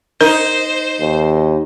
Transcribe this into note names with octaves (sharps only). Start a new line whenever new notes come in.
D#4 A#4 C5
D#2